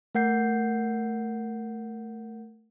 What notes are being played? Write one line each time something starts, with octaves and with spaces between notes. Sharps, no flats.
A3 A#4 F#5 G6 C7